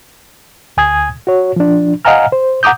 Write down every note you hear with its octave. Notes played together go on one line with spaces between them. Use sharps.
D2 G#5 D#6 G#6
F#4 C#5
F3 D4
D#5 F5 F#5 G#5 A#5 F6
C5
F#5 A#5 D6 D#6 G6